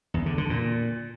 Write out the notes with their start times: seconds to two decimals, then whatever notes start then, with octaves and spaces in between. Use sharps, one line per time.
0.14 E2
0.26 D3
0.38 D3
0.50 A#2